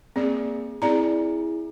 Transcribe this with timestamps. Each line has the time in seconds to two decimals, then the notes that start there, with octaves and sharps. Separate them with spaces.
0.16 A#3 C4 G#4 D5
0.82 C4 E4 G#4 D5 A#5